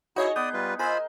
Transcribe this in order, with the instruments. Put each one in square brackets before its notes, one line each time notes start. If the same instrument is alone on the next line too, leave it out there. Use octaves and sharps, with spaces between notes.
[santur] D#4 G#4 [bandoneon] E4 [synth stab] F#4 C#5 D#5
[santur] B3 [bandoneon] D5 D#6 [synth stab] G6
[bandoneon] G3 F4 B4
[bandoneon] F4 C5 B5 [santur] A#4 D#5 [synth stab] G#5 E6